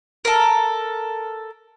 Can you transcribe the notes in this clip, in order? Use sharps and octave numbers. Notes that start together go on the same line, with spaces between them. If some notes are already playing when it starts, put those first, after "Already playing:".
A4 A#4